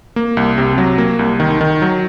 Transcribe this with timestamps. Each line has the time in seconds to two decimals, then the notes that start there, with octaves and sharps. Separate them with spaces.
0.16 A#3
0.37 C2
0.58 C3
0.78 F#3
0.98 A#3
1.19 C2
1.40 D#3
1.61 D#3
1.82 F#3